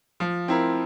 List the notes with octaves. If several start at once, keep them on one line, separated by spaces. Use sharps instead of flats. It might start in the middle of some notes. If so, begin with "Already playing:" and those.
F3
C4 E4 A#4